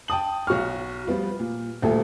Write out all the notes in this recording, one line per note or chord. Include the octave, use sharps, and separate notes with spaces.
G5 A5 D#6 F#7
B1 F#4 C#6 F6
F3 G3 B3 F4
A#2
D#1 D2 A#2 A4